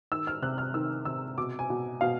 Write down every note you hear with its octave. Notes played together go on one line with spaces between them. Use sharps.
D#3 E6
F6
C3 F#6
F6
D#3 E6
C3 E6
B2 D6
G#5
B2
B2 F5